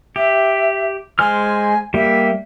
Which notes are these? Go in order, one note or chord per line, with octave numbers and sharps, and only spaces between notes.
G4 E5
G#3 C5 G#5 F6
G3 A#3 G4 E5